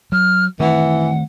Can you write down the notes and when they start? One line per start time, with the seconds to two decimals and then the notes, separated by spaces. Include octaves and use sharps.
0.12 F#3 F6
0.60 D#3 E3 A3 C4 F#5